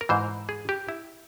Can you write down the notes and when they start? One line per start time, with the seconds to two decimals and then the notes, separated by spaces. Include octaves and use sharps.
0.01 A#4
0.09 G#2 E3 C5
0.49 G#4
0.69 G4
0.89 E4